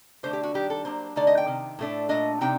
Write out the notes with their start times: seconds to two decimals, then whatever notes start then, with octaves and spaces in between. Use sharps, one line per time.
0.23 D3 A3 D4 C5
0.33 G4
0.43 F#4
0.54 D#3 G3 D4 G4
0.70 A4
0.85 F#3 A#3 D4 C5
1.16 D3 A3 D#4 D5
1.27 D#5
1.37 G5
1.47 C3 D#3
1.79 A2 A3 D4
2.09 A#2 A3 D4 D#5
2.41 C3 G3 C4 D#4 G5